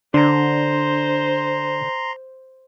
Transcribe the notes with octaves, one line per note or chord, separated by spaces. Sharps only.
D3 D4 C5 A#5 C6